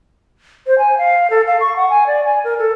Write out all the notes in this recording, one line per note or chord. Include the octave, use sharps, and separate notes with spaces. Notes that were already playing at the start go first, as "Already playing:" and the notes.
C5
G#5
F5
A4
F5
C#6
F#5
G#5
D5
G#5
A#4
A4